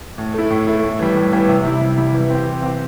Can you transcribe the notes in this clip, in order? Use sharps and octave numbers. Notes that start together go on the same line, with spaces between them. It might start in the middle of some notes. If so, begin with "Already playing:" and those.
A2
A3 E4
A2
A3 E4
A2
E3 G3
A2
E3 G3
C3
G3 E4
C3
G3 E4
E3
C4 G4
E3
C4 G4